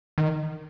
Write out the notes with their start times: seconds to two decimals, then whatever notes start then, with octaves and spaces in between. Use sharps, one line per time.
0.18 D#3